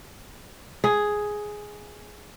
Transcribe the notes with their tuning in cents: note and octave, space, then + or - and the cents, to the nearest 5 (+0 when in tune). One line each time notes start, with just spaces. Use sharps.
G#4 +5